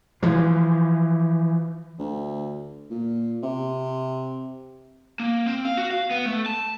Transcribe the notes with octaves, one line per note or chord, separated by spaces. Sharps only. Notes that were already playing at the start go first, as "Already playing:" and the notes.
E3 F3
D2
A#2
C3
A#3
C4
F5
F#4
F5
B3
A3
A5